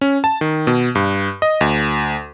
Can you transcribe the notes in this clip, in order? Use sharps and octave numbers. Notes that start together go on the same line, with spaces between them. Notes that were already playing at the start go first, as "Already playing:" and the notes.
C#4
A5
D#3
B2
G2
D#5
D2